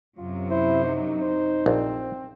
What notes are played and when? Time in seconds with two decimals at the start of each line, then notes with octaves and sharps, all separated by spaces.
0.17 F#2 C3 F#3 F4
0.50 E4 C5
0.84 D#4
1.21 C5
1.66 A#1 C4